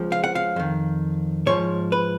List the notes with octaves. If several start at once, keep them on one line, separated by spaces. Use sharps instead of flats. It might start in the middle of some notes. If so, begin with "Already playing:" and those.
Already playing: C#2 F3
F5
F#5
F5
F2 D#3
G#2 F3 C#5
B4